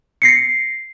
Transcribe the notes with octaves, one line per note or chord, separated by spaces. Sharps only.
A#6 C7 C#7